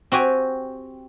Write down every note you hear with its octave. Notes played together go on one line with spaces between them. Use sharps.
C4 F#4 G4 G#5